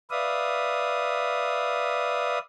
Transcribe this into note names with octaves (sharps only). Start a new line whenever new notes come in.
B4 D5 E5 F5 D#6